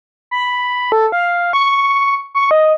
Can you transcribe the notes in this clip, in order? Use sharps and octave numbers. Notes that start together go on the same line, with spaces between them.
B5
A4
F5
C#6
C#6
D#5